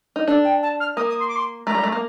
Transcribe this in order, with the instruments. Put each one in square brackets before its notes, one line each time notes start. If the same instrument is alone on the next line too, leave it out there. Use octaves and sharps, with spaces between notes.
[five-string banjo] D#4
[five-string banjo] D4 [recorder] A4
[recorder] G5
A5
F6
[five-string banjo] A#3 [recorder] D#6
[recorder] D#6
C6
D6
C6
[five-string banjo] A3 [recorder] A#5
[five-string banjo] G3
A3
A#3